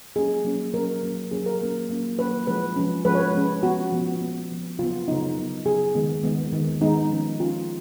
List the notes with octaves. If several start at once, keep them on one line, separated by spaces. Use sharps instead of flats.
F#3 A#3 C#4 G#4
F#3 A#3 C#4
F#3 A#3 C#4 A#4
F#3 A#3 C#4
F#3 A#3 C#4 G#4
A#4
F#3 A#3 C#4
F#3 A#3 C#4
F#3 A#3 C#4 B4
F3 G#3 C#4 B4
F3 G#3 C#4
F3 G#3 C#4 B4
C#5
B4
F3 G#3 C#4
F3 B3 F#4
F3 B3
F3 B3
F3 B3
C#3 F#3 B3 F4
C#3 F#3 B3 D#4
C#3 F#3 B3
C#3 F#3 B3 G#4
D#3 G#3 B3
D#3 G#3 B3
D#3 G#3 B3
D#3 G#3 B3 D#4
F3 G#3 C#4
F3 G#3 C#4 F4